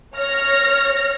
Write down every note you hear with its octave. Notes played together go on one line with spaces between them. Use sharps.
C#5 F6 A#6